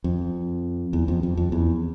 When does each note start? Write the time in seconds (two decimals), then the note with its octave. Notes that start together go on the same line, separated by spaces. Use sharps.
0.04 F2
0.93 E2
1.08 F2
1.23 F2
1.37 F2
1.52 E2